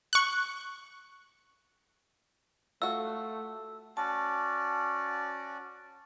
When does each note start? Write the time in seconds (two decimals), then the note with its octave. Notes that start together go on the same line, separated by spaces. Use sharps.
0.13 C#6 F#6
2.82 A3 F4 F#4 E6
3.97 C#4 F#4 D5 A5